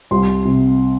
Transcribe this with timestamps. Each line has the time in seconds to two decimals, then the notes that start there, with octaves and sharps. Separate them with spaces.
0.11 C2 C6
0.45 C3